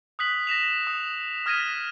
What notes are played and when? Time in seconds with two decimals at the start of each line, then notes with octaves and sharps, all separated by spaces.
0.19 D#6 F#6 B6 F#7
0.47 A#6 B6 E7 F7
0.87 D#6
1.46 D#6 F6 G#6 A#6 B6 D#7